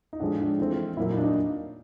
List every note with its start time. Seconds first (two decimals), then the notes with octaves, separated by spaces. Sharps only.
0.13 D#4
0.20 A2 F3 G#3 D4
0.39 D4
0.59 E3 A3 C4
0.97 A#2 F#3 A#3 E4
1.10 D#4
1.17 D4
1.23 D#4